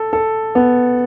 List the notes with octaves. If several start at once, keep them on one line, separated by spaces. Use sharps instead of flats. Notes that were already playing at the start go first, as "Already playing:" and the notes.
Already playing: A4
A4
B3